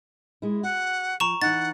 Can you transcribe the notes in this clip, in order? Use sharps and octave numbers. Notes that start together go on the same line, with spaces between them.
G#3 E4
F#4 F#5
F3 A#5 C#6 E7
E3 D#4 F#5 A6